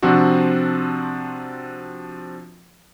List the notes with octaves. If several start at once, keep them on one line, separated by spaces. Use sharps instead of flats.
C3 F3 C4 D4 F#4